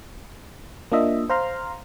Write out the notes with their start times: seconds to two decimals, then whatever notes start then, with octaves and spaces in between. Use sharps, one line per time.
0.92 A#3 D4 F4 D#5 E5
1.30 C5 F5 A#5 C6 F6